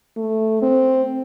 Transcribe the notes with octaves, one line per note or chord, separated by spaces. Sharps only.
A3
C4